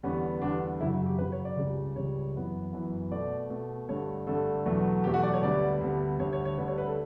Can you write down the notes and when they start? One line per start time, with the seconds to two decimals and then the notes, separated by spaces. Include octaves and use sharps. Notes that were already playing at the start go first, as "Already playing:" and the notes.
0.03 E2 D3 G3 B3 C#4
0.42 E2 D3 G3 B3 D4
0.80 F#2 C#3 F#3 E4
0.93 F#4
1.06 G4
1.19 F#2 C#3 F#3 B4
1.32 C#5
1.45 D5
1.57 C#2 C#3 G3
1.96 C#2 C#3 G3 C#5
2.34 F#2 E3 B3
2.73 F#2 E3 B3
3.11 B2 A3 D5
3.50 B2 A3
3.89 G2 D3 A3 C#5
4.27 G2 D3 A3 A4
4.66 E2 B2 F#3 A3
5.04 E2 B2 F#3 A3 G4
5.14 F#4
5.23 D5
5.33 C#5
5.43 D2 D3 G3 B3 D5
5.81 D2 D3 G3 B3
6.19 D2 D3 G3 C#5
6.33 C#5
6.45 C#5
6.58 D2 D3 G3 B4
6.68 C#5
6.78 B4
6.87 A4